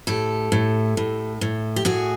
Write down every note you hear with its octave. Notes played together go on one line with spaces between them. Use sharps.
A2 G4 A4
A2
A2
A2
G4
A2 F#4 G#4